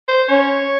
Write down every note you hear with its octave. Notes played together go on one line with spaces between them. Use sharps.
C5
C#4 C#5